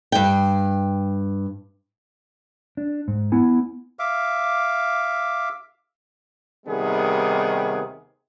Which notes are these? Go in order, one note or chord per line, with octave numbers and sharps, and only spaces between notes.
G2 G5
D4
G#2
B3 E4 G#5
E5 F5 D6
D#2 C3 D#3 G3 B3 G#4